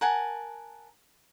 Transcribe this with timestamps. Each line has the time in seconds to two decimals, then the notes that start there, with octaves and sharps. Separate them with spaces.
0.01 A#4 F#5 G#5 A5